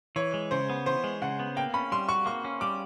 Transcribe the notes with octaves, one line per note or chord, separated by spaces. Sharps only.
E3 C#5
G#3
C#3 C5
B3
E3 C5
G#3
C#3 F#5
B3
A#3 G5
C#4 B5
G3 C6
F#4 C#6
A#3 C#6
C#4
G3 D6